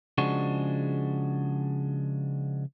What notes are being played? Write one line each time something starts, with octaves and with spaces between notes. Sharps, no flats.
C#3 F3 G#3 D4 F#4